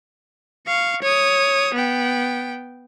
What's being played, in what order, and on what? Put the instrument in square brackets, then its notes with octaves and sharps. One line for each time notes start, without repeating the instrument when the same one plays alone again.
[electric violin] F5 C#6
C#5 D#6
B3 G5